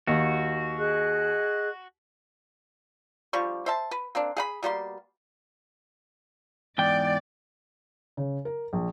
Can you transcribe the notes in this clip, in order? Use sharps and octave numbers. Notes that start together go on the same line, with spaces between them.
D#2 F#4
G#4 D#5 F#6
D3 F3 G3 C#6
C5 E5 A5
B4
A#3 C4 D4
G#4 F#5 B5
B2 G3 A#3 C6
E2 G#2 D5 G5
C#3
A#4
A#1